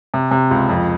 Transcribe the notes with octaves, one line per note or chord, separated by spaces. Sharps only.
C3
C3
C#2
F2